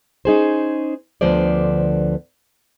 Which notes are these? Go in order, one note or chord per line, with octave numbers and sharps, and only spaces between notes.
C#4 D#4 G#4 C5
D2 D3 F3 B3 C5 D5